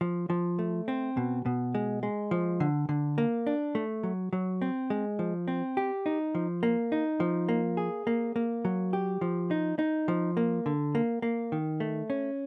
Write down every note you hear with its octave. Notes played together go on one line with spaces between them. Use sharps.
F3
F3
A3
C4
B2
B2
G#3
G#3
F3
D3
D3
A#3
D4
A3
F#3
F#3
C4
G#3
F3
C4
G4
D#4
F3
A#3
D#4
F3
A#3
G#4
A#3
A#3
F#3
G4
F3
D#4
D#4
F3
A#3
D3
A#3
A#3
D#3
A3
C#4